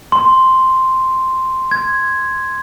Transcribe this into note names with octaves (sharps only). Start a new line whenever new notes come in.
C6
G#6